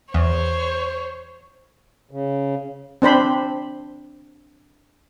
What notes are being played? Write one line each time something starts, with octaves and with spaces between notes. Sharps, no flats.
E2 C5 C#5
C#3
C4 D4 C5 B5